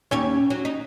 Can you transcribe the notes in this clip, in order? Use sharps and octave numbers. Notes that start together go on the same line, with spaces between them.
D#2 C#4 G4 C#5
F#3
D#4